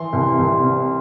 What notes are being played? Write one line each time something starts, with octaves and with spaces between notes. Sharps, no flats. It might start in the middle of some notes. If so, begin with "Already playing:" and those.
Already playing: E3 C6
C2
C2
C3